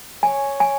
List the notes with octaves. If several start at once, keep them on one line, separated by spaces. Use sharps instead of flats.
C#5 G#5
G#5